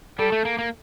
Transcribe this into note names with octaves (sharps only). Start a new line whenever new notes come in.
G3 A4
A3
A#3
A#3